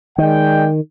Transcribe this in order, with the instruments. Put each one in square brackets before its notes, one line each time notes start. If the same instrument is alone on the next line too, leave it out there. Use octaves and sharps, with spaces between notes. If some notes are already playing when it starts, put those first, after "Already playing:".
[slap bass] D#3 [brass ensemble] G#3 D5 G5